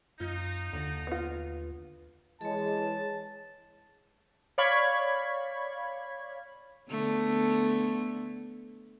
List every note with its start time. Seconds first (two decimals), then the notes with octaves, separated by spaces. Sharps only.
0.20 F#2 D#4 F4
0.73 D#2 D3 D5
1.07 B3 F4
2.41 E3 G#3 G#4 C#5 A5
4.58 C#5 D5 F5 B5 C#6 G#6
6.89 D3 A3 B3